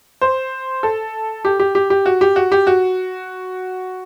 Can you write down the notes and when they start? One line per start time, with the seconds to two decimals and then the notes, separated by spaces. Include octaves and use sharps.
0.21 C5
0.83 A4
1.45 G4
1.59 G4
1.75 G4
1.90 G4
2.06 F#4
2.21 G4
2.36 F#4
2.52 G4
2.67 F#4